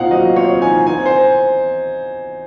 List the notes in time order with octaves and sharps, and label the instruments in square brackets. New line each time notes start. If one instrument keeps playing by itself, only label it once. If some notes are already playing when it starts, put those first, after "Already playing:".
Already playing: [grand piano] A#2 C4 D#4 F5 F#5
F#3 D#5
C4 C#5
D#4 G#5
C4 G#5
C5